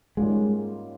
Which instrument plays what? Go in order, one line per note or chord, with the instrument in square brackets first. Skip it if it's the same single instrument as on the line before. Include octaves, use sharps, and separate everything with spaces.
[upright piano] G#2 G3 A#3 C#4 F4 [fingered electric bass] G#3